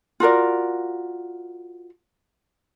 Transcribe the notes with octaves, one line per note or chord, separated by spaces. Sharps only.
F4 F#4 A#4 D5